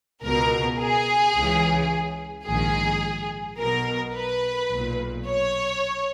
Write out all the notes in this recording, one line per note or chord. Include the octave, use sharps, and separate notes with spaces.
C#2 B2 A#4
G#4
C#2 C#3 E3
A#1 G#2 D#3 G#4
B1 B2 A#4
B4
B1 A#2
C#5